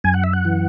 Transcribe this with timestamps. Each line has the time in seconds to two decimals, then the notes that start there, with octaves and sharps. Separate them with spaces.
0.04 F#2 G#5
0.14 F#5
0.24 E5
0.33 F#5
0.45 E3